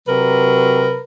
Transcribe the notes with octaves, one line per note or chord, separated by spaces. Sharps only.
C3 F#3 A#4 B4